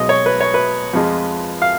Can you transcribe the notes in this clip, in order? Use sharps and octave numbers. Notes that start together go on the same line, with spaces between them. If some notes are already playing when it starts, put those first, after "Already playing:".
Already playing: B1 B2 G#3 D#5
C#5
B4
C#5
B4
F2 F3 G#3
F5